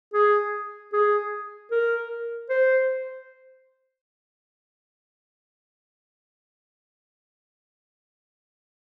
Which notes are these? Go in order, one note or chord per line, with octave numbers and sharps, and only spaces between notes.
G#4
G#4
A#4
C5